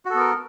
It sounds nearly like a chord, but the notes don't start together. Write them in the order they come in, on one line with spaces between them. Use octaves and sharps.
F#4 A4 B3 A#4